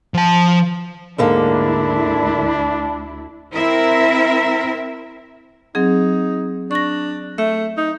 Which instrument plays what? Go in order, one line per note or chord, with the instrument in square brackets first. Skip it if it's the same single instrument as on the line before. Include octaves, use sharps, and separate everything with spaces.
[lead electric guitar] F3 A5
[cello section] D2 E4 [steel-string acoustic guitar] G#2 D3 A#3 [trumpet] D4
[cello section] C4 E4 A#4 E5
[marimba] F#3 C4 G#4 [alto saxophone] D#4
[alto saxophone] D4 [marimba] C#6 A#6
[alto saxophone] A3 [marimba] E5
[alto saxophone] D#4